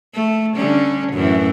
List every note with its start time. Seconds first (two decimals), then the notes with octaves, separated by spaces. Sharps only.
0.14 A3
0.55 D3 G3 C#4
1.13 F#2 A2 E3